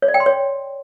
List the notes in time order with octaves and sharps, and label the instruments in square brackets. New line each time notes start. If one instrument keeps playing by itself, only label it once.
[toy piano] C#5
D5
G5
C6
C#5